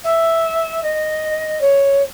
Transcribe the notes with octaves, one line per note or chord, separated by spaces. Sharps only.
E5
D#5
C#5